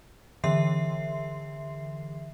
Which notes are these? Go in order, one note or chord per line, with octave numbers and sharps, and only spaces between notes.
D3 E3 E5 C6 C7